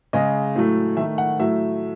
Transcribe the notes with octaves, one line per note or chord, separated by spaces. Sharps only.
C#3 G#3 D#5
A2 F#3 A3
D#3 A3 E5
F#5
A2 F#3 A3 E5